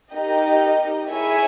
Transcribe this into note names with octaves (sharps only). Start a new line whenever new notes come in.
D#4 G4 A#4 D#5
E4 G#4 C#5 E5 G#5